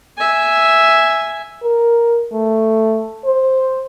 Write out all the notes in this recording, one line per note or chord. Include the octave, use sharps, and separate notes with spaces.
E5 G#5
A#4
A3
C5